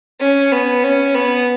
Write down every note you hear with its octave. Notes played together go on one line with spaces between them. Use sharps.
C#4
B3
C#4
B3